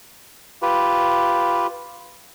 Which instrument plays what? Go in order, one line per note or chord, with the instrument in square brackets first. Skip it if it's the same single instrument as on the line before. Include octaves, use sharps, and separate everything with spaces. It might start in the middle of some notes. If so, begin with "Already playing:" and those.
[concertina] F4 G4 B4